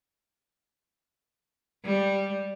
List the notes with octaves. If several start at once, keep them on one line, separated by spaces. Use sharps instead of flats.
G3